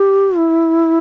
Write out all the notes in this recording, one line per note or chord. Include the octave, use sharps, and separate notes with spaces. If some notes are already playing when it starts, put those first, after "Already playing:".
Already playing: G4
E4